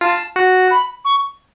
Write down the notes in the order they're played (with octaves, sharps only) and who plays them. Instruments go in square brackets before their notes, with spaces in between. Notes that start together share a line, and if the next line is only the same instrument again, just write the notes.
[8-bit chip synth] F4 [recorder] A5
[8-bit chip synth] F#4
[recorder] B5
C#6